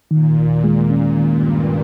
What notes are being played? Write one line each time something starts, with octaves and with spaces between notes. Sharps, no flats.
A#2 D#3
D#2
G#3
A#2 C#4
D#3
G2
D#2